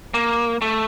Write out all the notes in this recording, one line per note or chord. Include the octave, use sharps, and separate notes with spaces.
A#3
A3